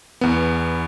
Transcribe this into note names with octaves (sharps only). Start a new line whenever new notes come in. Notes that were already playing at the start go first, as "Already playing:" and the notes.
E2 B3